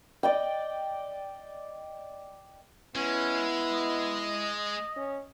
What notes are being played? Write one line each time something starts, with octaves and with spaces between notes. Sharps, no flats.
D5 D#5 G5
G#3 B3 C#4 E4
D#5
C#4